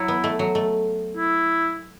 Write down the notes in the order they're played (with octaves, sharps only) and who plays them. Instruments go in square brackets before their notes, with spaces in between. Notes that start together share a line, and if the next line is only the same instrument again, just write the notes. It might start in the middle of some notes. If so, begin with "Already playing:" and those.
Already playing: [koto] F#3 [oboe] E4
[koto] B3
A3
F#3
A3
[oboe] E4